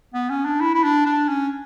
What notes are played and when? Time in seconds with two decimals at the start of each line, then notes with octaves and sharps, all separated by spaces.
0.14 B3
0.30 C#4
0.45 D4
0.60 E4
0.74 E4
0.83 D4
1.06 D4
1.28 C#4